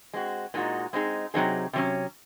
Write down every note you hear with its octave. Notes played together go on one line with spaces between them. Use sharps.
G#3 C4 F#4
A#2 G#3 D#4 F#4
G#3 C4 D#4 G#4
C3 F#3 C4 D#4 G#4
C3 F#3 C#4